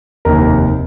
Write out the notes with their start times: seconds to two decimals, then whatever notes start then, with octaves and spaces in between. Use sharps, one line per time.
0.25 F1 D#2 D#3 A#4 A#5